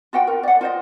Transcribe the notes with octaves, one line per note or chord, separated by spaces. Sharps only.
F4 F#4 F#5 G5
A#4
D5 F#5
F4 C5 D#5